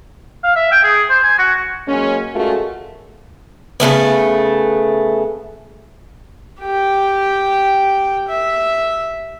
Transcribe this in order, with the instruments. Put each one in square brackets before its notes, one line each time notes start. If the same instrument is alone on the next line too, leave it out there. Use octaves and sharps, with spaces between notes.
[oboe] F5
E5
G5
G#4
C5
G#5
F#4
[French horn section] F#3 G#3 A#3 C#4
G#3 A3 C#4 F4 F#4 A#4
[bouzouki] C#3 G#3 A3 B3
[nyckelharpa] G4 G5
E5